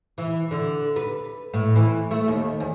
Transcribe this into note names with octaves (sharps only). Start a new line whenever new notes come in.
E3
D3
B4
A2
E3
A3
D#2
E2